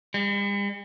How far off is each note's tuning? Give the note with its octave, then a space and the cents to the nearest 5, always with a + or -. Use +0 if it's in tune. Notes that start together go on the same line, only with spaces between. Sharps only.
G3 +45